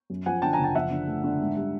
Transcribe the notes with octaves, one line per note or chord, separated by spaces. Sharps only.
F#2
F3 F#5 G#5
D3 G5 A5
G#5 A#5
F#1
G5 A5
F3 E5 F#5
D3
A3
D3
G#2
G3